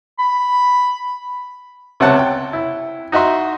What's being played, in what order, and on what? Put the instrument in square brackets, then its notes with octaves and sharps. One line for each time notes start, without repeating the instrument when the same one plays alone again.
[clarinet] B5
[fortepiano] C#2 C3 C#4 F#5 A5 F#6
G5
E4
D#4 F#4 D#5 E5 C6